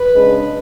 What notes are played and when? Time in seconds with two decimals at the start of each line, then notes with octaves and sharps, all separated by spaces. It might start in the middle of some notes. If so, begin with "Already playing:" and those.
Already playing: B4
0.14 C#3 G#3 D4